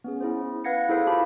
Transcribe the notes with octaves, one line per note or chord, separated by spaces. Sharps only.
B3 C#4 G#4
E4 G#4 C5
B4 F5 F#5 G#6 A#6 C#7
E4 G#4 A4 C5 F5
F4 G4 A5 B5